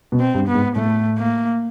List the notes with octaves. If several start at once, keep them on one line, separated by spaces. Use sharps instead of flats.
B2
C4
G2
B3
G#2
A2 A3
A#3